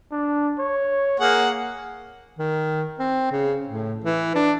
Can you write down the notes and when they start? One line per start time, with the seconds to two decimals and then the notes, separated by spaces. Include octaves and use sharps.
0.11 D4
0.59 C#5
1.20 A#3 G#4 F#5
2.39 D#3
2.99 C4
3.32 C#3
3.67 A2
4.04 E3
4.35 D4